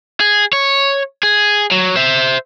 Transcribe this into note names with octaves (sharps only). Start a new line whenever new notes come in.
G#4
C#5
G#4
F#3
C5 E5